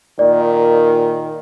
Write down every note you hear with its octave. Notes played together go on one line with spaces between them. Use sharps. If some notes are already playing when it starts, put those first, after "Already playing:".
A#2 D#3 D5